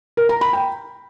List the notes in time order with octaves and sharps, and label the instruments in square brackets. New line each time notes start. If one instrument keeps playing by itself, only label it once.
[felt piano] A#4
A#5
B5
G5